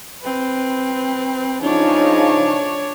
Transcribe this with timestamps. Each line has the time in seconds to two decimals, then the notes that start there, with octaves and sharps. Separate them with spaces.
0.22 C4 B4
1.61 C#3 F3 D4 D#4 C#5